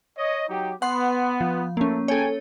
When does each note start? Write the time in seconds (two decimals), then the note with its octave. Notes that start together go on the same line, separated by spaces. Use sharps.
0.17 C#5 D#5
0.49 F#3 D#4 G4
0.82 B3 F#5 C6
1.41 F3
1.77 A3 A#3 C#4
2.08 G#4 A4 C#5 G5 G#5